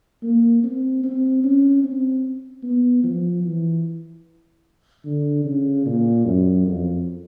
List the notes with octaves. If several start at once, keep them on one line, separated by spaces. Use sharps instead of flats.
A#3
C4
C4
C#4
C4
B3
F3
E3
D3
C#3
A#2
F#2
F2